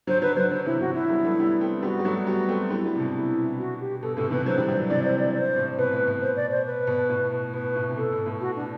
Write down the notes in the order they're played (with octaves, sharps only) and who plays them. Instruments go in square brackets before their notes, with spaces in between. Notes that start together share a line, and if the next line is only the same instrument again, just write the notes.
[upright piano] D3 F#3 [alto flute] C5
[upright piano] D3 F#3 [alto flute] B4
[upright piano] D3 F#3 [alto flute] C5
[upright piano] D3 F#3 [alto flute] C5
[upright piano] C3 E3 [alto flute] E4
[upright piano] C3 E3 [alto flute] F#4
[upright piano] D3 F#3 [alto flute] E4
[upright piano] G3 B3
F#3 A3
G3 B3
A3 C4
[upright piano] G3 B3 [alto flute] F#4
[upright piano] G3
F#3 A3
[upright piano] G3 B3 [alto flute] F#4
[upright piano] A3 C4
[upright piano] G3 B3 [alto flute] E4
[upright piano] G3 B3
C3
B2 D3
[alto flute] E4
F#4
G4
[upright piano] B2 [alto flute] A4
[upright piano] A2 C3 [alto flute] A4
[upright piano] C3 E3 [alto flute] B4
[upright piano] D3 F#3 [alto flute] C5
[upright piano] E3 G3
E3 G3
D3 F#3
[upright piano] C3 E3 [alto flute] D5
[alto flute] C5
D5
C5
[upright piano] A2 C3
[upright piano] B2 [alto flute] B4
[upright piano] A2
B2
[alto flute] C5
D5
C5
B4
[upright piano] B2
A2
B2
[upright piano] B2 [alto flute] B4
[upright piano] A2
C3
[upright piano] B2 [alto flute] A4
[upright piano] B2
A2
[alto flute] F#4
D4